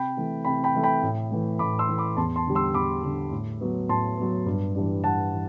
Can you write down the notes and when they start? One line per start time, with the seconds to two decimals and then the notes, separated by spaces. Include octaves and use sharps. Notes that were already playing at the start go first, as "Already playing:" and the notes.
Already playing: C3 G5 B5
0.17 E3 A3
0.45 C3 G5 B5
0.64 G5 B5
0.74 E3 A3
0.83 G5 B5
1.03 A2
1.31 E3 A3
1.59 A2 B5 D6
1.79 C6 E6
1.88 E3 A3
1.98 B5 D6
2.17 E2 A5 C6
2.36 A5 C6
2.46 D3 G3
2.55 C6 E6
2.74 E2 B5 D6
3.04 D3 G3
3.32 A2
3.61 F#3 B3
3.89 A2 A5 C6
4.17 F#3 B3
4.46 G2
4.75 E3 G3 D4
5.04 G2 F#5 A5
5.32 E3